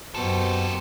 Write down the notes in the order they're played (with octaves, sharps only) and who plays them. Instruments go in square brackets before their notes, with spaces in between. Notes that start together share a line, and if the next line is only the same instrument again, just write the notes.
[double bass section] F#2 [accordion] B2 [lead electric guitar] A#3 A4 [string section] G4 C5 G5